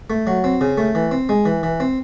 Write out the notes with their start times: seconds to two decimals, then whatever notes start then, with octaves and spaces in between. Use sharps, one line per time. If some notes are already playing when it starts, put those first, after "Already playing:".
0.10 A3
0.27 F#3
0.44 C4
0.61 C#3
0.78 A3
0.95 E3
1.11 C4
1.29 G#3
1.46 E3
1.63 E3
1.80 C4